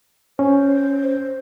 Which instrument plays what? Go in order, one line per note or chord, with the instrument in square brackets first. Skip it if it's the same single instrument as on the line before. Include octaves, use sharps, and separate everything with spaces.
[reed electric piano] C#4 [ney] C5